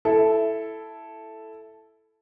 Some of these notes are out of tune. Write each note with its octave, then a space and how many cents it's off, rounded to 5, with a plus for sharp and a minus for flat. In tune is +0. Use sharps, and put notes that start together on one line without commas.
E4 +5 A4 -5